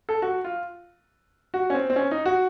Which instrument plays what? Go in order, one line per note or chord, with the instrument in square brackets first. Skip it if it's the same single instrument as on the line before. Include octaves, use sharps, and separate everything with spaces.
[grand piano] A4
F#4
F4
F#4
C#4
C4
C4
C#4
D#4
F#4